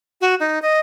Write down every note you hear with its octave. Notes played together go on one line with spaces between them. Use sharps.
F#4
D#4
D#5